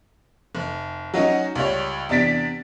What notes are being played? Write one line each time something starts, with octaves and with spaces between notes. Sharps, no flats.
F1
F#3 C#4 D#4 F#4
C#2 G3 C#5
E2 C3 D4 A6 B6 D7